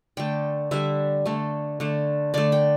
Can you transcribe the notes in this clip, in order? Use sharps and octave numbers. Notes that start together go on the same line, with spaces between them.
D3 A3 G5
D3 G3 E5
D3 A3
D3 A3
D3 A3 D5
G5